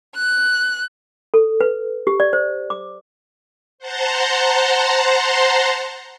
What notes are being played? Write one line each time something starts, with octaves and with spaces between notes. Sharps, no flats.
F#6
A4
B4
G4
D5
C5
D6
C5 F#5 A5 A#5 C6